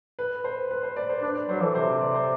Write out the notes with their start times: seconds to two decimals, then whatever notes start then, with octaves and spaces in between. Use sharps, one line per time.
0.19 B4
0.44 C5
0.71 B4
0.83 C5
0.96 D5
1.09 C5
1.22 D4 B4
1.35 D5
1.49 F#3 C5
1.61 E3 A4
1.75 C3 C5
2.01 D5
2.14 C5